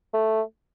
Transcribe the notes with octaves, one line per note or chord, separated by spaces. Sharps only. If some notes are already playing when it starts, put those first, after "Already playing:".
A3